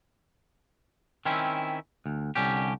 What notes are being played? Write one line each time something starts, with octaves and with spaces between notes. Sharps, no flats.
D#3 C4 C#4 E4
D2
C2 D3 C#4 G4